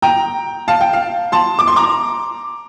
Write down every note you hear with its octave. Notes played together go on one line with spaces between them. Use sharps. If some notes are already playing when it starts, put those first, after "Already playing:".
G5 A#5
F5 A5
G5
F5
A5 C6
D6
C6
A#5 D6